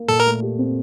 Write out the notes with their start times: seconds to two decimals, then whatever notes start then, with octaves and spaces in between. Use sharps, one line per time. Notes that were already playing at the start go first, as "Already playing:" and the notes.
Already playing: A#3
0.08 A#2 A4
0.20 A#4
0.26 A3
0.42 G4
0.59 C4